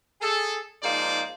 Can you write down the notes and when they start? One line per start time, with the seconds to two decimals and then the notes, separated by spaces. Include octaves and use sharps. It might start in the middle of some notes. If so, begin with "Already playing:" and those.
0.21 G#4 A4
0.83 G#2 F3 A#3 D#4 C5 D5